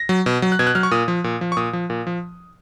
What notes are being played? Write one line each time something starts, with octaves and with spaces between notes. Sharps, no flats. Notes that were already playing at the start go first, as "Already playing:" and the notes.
Already playing: A#6
F#3
B2
F#3
F#6
B2 G#6
F#6
F#3 F6
C#6
A#2 D#6
F3
A#2
F3
C#6
A#2 D#6
F3
A#2
F3